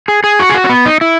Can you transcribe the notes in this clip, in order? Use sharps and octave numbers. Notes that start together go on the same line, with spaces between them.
G#4
G#4
F#4
G#4
F#4
C#4
B3
D#4
E4